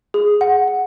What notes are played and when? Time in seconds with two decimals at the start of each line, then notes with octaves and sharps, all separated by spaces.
0.14 G#4
0.41 F#5
0.68 F#5